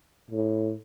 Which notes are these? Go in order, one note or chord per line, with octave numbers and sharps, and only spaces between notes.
A2